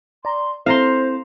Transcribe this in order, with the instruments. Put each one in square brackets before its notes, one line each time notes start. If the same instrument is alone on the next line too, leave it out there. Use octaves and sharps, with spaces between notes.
[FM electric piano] D5 A#5 [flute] C6
[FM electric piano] C4 E4 A4 [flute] C5 [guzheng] F5 A#5 C6